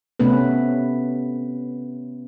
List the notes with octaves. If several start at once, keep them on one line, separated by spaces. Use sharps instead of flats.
C3 A3 B3 C#4 B4